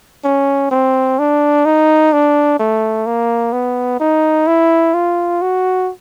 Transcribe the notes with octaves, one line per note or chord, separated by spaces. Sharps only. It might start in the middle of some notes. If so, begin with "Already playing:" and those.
C#4
C4
D4
D#4
D4
A3
A#3
B3
D#4
E4
F4
F#4